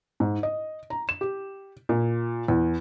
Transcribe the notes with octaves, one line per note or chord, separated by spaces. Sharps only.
G#2
D#5
A#5
E7
G4
A#2
E2